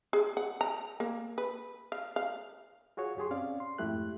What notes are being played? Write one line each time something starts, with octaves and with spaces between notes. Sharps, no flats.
G#4
F#5
A#5
A#3
B4
F5
F5
F4 F#4 G#4 C#5
F#2 G4 G#4 C6
C4 C#4 D5 F5
C6
F2 G#2 A3 E4 G4 F#6